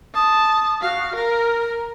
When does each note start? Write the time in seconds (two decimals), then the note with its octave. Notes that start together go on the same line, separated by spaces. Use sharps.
0.14 A5 D#6
0.82 F#4 F5
1.15 A#4 A#5